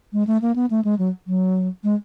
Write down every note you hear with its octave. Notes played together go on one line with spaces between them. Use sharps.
G#3
A3
A#3
B3
A3
G#3
F#3
F#3
G#3